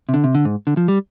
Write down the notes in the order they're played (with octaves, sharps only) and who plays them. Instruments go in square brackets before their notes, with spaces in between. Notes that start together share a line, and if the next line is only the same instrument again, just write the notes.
[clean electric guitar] C3
D3
C3
D3
G#2
D3
F3
G3